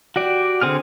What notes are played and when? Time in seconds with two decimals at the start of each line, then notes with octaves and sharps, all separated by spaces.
0.16 F#4 G4 D5
0.62 D3 C4 G#4 F6